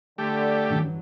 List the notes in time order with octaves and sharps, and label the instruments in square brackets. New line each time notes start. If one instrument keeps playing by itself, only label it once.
[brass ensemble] D3 [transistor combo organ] A3 G4
[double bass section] G2 E3 F#3 [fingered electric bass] D#3 C#4 D4